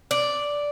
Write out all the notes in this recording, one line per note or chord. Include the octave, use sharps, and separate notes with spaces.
D5